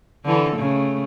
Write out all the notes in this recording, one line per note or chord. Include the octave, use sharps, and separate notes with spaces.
D3 E3 A4
C#3 A3